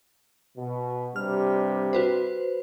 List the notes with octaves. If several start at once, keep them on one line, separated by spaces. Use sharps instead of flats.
B2
G2 C3 G3 F6
F#4 B4 C5